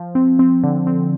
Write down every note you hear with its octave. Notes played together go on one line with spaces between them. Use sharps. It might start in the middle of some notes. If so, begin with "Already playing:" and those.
Already playing: F3
C4
C4
D3
C4